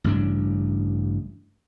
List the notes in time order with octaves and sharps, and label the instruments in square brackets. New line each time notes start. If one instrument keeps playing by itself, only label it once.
[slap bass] A1 G2 C#3 D4